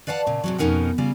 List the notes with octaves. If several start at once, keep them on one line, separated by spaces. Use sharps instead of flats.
B4 D5 F5 F#5 A5
A#2 C#3
G#2 C3 F#3
F2 B2 C#4 D#4 A#4 F#5
C#3 G3 F4